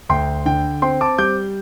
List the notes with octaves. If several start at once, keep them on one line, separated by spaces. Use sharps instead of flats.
D2 G5 C6
D3 G5
C4 G5 C6
A5 D6
G3 D6 G6